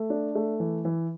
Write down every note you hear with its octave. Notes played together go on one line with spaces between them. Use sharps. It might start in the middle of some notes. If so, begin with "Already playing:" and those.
Already playing: A3
D4
A3
E3
E3